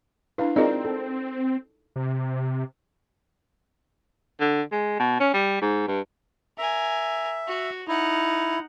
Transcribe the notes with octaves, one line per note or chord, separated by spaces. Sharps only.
D4 E4 B4 F5
C4 D#4 F4 G#4 A#4 D5
A4
C3
D3
G#3
B2
C#4
G3
G#2
G2
A#4 E5 G#5
F#4
D#4 E4 F#5